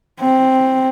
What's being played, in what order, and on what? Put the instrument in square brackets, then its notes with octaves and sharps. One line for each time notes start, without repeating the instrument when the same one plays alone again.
[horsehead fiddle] C4